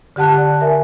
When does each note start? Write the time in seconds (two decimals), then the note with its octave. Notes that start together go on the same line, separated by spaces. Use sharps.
0.16 D3 G4 F#5 A5 F#6
0.37 D5
0.61 A#4 E5 G#5